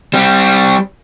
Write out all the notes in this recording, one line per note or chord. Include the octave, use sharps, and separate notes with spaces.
G3 C4